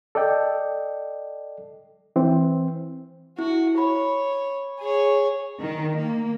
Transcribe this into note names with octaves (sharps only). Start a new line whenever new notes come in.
A4 D5 D#5 G5
E3 C4
E4 F#4
C#5 B5
G#4 C#5
D#3
A#3